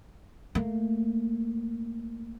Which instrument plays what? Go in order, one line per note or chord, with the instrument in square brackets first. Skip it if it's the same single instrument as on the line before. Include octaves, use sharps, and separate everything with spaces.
[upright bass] A3 A#3